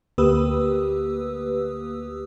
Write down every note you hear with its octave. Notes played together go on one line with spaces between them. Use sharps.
D2 A#3 G4 B4 D#6 E6